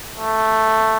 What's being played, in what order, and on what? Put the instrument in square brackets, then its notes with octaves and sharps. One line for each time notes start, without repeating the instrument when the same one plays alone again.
[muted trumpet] A3